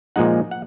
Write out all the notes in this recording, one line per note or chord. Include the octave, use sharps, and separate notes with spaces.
A#2 F3 G#3 D#4 F#5
F#5